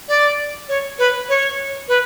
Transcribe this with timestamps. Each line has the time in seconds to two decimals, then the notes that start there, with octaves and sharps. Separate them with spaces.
0.08 D5
0.69 C#5
0.99 B4
1.29 C#5
1.88 B4